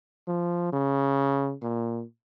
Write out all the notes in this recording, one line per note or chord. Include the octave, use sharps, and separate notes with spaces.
F3
C#3
A#2